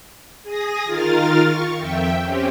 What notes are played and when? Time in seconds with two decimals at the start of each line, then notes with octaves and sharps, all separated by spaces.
0.43 G#4 D#6 A#6
0.85 D#3 F4 A#4 F6 A6
1.47 C#6
1.77 F2 E5 G5
2.20 C4 C#4 G4